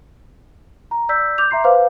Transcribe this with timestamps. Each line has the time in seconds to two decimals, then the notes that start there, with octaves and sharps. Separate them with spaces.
0.91 A#5
1.09 D5 E6 G6 B6
1.38 D6 G6 F7
1.51 E5 A#5 C6 C7
1.64 B4 C5 F5 D6